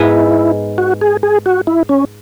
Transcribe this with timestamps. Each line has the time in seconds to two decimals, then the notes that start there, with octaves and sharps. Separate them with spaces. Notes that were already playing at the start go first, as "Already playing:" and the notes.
Already playing: G#2 G#3 B3 E4
0.78 F#4
1.01 G#4
1.23 G#4
1.46 F#4
1.67 E4
1.89 C#4